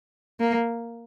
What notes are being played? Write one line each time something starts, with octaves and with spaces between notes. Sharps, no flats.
A#3